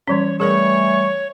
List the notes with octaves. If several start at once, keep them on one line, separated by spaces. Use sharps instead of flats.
E3 G3 C#4 C#5
E3 G3 A3 G#4 A#4 C#5 D5 C#6